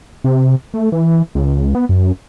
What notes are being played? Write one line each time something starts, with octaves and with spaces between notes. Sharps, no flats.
C3
A3
E3
C#2
B3
F#2